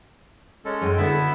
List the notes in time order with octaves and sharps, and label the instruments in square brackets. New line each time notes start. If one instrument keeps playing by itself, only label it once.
[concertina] G#3 C#4 A4
[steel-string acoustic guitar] F#2 G#4 G5
[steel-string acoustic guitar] D3 F#4 A4 [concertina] B3 E4 E5